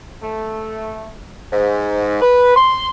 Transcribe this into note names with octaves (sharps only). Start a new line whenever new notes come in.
A3
G#2
B4
C6